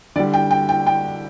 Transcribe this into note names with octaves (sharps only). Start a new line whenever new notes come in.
D3 G3 D5
G5
G5
G5
G5